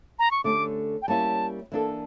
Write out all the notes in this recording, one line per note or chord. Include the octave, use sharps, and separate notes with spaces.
A#5
C#6
D3 A3 C#4 G4 D6
G5
G3 A#3 C#4 E4 A5
E3 A#3 D4 A4